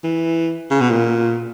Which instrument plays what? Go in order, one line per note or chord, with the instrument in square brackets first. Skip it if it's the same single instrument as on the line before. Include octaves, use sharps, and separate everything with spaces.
[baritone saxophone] E3
C#3
B2
A#2